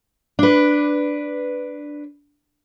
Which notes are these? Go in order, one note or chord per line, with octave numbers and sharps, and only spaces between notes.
D4 B4